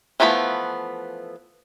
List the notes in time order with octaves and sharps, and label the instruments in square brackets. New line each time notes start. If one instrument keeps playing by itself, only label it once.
[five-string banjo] E3 F3 A3 B3 B5